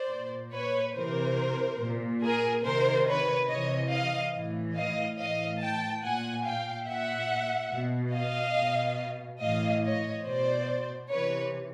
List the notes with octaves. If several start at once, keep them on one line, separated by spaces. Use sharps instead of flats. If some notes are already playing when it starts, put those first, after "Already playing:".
Already playing: C5 D5
A#2
B4 C#5
C3 E3 A#4 C5
A#2
G#4 A#4
C3 D#3 A#4 C5
B4 C#5
C3 E3 C#5 D#5
D#5 F5
A2 E3
D#5 F5
A2 E3 D#5 F5
G5 A5
A#2 F#5 G#5
F5 G5
A#2 E5 F#5
B2
D#5 F5
B2
A2 E3 D#5 F5
C#5 D#5
B2 C5 D5
C3 E3 B4 C#5